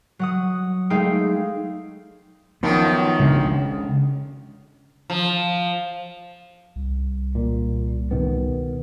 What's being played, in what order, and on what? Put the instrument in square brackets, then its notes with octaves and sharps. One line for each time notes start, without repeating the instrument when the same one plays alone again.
[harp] F#3 F#5 D#6
G#3 A3 D#4 G#4 F5 G5
[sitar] F#2 D#3 F3 [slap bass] B3
[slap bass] C#3 G#3 D4
[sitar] F3
[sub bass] C2
[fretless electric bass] A#2
B2 D#3 B3